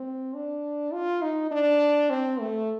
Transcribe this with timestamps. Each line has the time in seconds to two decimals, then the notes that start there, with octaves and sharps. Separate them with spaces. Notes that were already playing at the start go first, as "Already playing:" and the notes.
Already playing: C4
0.34 D4
0.93 F4
1.22 D#4
1.51 D4
2.10 C4
2.39 A3